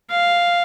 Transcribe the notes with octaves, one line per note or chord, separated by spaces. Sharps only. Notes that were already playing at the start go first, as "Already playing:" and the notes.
F5